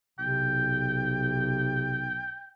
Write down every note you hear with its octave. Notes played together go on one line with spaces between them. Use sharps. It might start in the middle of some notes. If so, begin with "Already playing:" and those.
B1 C3 G5